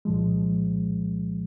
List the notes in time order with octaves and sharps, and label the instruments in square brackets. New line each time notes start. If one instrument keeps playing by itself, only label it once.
[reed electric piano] C2 A#2 F3 G#3